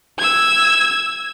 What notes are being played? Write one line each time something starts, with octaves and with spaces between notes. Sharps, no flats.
E6 G#6